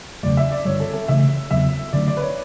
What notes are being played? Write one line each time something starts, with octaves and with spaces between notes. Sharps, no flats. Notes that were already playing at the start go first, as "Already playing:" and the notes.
E2 C#3 F#3 A3 D5
E5
D5
G2 D3 G3 C#5
A4
A4
C#3 E3 A3 E5
E2 C#3 F#3 B3 E5
D3 F#3 A3 D4 D5
D5
B4
C#5